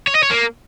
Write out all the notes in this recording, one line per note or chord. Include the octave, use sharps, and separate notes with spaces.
C#5
D#5
C#5
A#3